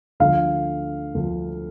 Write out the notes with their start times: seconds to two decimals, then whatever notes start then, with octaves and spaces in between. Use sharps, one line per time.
0.20 D2 D3 F3 F5
1.15 D2 D3 F3